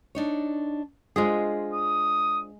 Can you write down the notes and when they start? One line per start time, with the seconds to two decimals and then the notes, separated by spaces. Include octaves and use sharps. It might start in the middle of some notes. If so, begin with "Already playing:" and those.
0.15 D4 D#4 C#5
1.16 G#3 D4 F4 G#4 C5
1.74 D#6